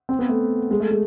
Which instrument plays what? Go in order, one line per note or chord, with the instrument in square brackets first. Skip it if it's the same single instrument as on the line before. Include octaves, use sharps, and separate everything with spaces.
[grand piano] C4
B3
A3
G#3
A3
G#3